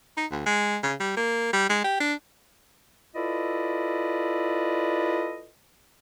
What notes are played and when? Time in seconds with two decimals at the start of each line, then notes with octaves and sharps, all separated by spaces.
0.17 D#4
0.31 D2
0.46 G#3
0.83 C#3
1.00 G3
1.17 A#3
1.53 G3
1.69 G#3
1.84 G4
2.00 D4
3.15 E4 F4 A4 B4 D5 D#5